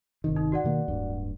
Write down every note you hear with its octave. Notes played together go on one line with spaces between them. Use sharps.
G1 C3 D#3
D#4
F#4 D5 F#5
B2 D#3 A#3
D1 G2